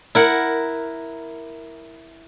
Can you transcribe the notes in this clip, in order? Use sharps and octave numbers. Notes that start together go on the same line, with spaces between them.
E4 A#4 F#5